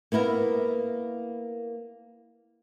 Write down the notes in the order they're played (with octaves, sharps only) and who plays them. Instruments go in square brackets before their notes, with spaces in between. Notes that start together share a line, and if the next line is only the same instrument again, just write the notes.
[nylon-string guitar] A#3 B3 E4 A#4